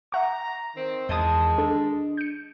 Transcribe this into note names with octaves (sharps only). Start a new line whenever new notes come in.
E5 F#5 A#5 C#6
D#3 C4
E2 D#3 G#3 D#5 A5 D#6
D4 A4
G6 C#7